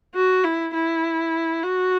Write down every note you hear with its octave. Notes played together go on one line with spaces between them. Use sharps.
F#4
E4
E4
F#4